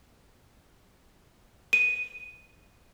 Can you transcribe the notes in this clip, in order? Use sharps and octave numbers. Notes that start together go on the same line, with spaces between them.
D#7